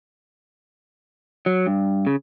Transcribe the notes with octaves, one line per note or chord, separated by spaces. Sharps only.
F#3
G2
C#3